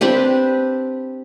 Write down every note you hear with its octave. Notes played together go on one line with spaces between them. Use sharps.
C4 D4 G4 B4